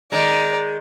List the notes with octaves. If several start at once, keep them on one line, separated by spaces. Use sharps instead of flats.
D#3 G#3 D5 A#5